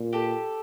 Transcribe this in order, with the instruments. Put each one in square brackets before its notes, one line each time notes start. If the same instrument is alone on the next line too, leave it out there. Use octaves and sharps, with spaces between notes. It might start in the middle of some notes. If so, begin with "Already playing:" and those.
Already playing: [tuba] A#2
[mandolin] G4 A4